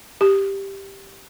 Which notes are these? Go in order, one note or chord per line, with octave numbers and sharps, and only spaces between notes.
G4